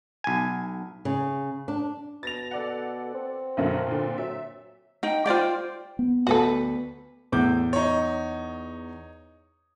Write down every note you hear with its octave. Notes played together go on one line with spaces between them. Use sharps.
B1 G#5
C#3
D4
B2 A6 A#6 F7
A4 D5 F#5
C4
B1 F#2 D3
A#2 D3
F#3 E5
D#4 G5
F4 C5 D5 G5
B3
D2 F#4 A4 B4
E2 A2 D6 G6
D#4 C#5